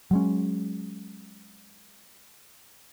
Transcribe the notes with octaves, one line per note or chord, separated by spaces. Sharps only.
F#3 G#3 C#4